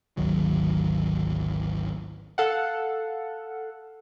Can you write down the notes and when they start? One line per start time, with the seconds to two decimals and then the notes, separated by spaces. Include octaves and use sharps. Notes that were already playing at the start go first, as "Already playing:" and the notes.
0.17 G#1 D2 D#3 F#3
2.38 A4 F5 F#5